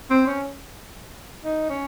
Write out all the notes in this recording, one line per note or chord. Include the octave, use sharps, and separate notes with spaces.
C4
C#4
D#4
C#4